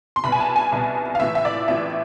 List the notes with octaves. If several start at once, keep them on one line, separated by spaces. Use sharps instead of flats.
C6
C2 B2 B5
G#5
A5
G#5
C2 B2
F5
A1 A2 E3 E5
E5
D5
A1 A2 E3 E5